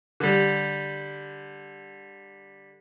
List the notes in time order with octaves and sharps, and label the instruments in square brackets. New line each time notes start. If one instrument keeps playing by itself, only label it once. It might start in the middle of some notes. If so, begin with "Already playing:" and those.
[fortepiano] D3 G3